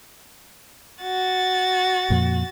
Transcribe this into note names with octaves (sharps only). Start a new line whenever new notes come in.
F#4 A6
F2 A#2